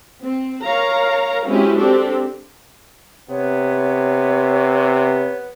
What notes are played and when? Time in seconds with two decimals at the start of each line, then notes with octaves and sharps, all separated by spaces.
0.23 C4
0.63 A#4 C#5 F5 A#5
1.47 F#3 G#3 C4 C#4 E4 G4
1.77 C4 D4 G4 A4
3.30 C3 B3 C#5